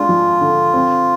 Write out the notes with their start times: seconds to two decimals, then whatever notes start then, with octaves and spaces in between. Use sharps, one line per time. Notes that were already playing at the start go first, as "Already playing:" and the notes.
Already playing: G#3 D4 F4
0.09 F3
0.41 D3
0.74 C4